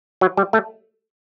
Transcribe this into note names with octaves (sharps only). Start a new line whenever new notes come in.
F#3
G3
A3